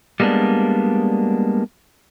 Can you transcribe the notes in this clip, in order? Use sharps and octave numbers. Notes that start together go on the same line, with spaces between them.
G3 G#3 A#3 B3 D4